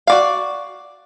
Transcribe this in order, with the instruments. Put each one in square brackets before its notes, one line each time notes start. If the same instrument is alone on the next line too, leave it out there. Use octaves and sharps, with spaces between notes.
[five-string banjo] F#4 D5 F5